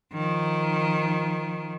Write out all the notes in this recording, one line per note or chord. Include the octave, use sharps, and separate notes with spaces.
D#3 F3